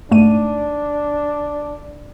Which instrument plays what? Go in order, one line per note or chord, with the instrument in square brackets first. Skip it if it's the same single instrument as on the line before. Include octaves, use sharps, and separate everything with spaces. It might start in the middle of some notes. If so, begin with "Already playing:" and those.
[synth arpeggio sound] G#2 A3 D#7 [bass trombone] D4